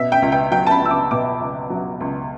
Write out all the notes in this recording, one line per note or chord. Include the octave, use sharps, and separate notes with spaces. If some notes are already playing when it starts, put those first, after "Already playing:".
Already playing: B2 E5
G5
C#2
G5
F#3 G5
A5
B5
C#2 E6
D6
B2 D6
C#2
F#3
C#2